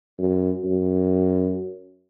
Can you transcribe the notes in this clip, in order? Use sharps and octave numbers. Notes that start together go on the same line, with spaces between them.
F#2
F#2